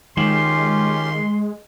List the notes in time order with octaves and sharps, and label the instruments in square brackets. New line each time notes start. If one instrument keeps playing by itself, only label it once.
[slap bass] D#3 [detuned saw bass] G#3 [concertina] C#4 F4 G4 [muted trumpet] C6